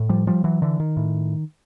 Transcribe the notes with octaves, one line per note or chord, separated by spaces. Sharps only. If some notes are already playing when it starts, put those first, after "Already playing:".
Already playing: A2
F3 G3
F3 G3
E3 F#3
D3 E3
D#3
A2